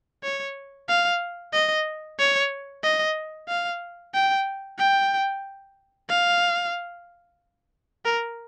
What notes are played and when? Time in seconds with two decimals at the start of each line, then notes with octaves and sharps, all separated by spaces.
0.23 C#5
0.89 F5
1.53 D#5
2.19 C#5
2.84 D#5
3.49 F5
4.14 G5
4.79 G5
6.10 F5
8.05 A#4